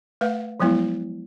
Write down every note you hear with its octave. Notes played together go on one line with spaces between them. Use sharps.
A3 B4 F5 F#5
F3 F#3 G#3 B3 E4